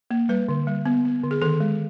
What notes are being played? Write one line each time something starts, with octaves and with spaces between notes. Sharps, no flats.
A#3
G3 B4
D3
G3
B3
B3
D3
G#4
D#3 A4
G#3